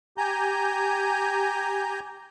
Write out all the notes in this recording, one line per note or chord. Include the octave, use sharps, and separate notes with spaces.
G4 G#5 A#5 G6